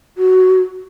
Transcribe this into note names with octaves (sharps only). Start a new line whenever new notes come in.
F#4